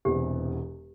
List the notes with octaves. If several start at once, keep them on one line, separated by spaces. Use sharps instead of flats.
E1 E2 C3 E3 G4